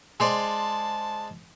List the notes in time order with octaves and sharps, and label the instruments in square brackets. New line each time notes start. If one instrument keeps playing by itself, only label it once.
[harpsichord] G#3 C5 D5 [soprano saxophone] A5